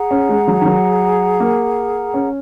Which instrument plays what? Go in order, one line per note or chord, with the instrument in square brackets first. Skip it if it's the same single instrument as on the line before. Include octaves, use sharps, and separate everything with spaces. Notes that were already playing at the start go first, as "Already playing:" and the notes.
Already playing: [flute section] G#4 F#5 A#5
[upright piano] C#4
G#3
F#3
D#3
F#3
A#3
C#4